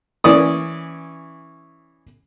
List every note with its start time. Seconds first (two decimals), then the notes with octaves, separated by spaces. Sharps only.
0.24 E3 C#4 D5 D#6